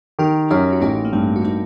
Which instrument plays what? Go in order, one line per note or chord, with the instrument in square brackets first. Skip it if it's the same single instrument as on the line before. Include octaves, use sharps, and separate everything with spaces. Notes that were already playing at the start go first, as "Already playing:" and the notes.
[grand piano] D#3 [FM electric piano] G4 A#4
[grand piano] F#2 [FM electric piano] D#4 G4
[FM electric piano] F#4
[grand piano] A1 [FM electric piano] D#4 G4
[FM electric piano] A#3
[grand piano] G2 [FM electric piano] A3 C4
[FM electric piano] F#4
C4 D#4